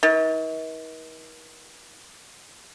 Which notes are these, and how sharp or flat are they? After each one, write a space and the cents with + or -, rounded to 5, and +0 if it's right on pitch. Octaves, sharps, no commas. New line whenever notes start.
D#3 +45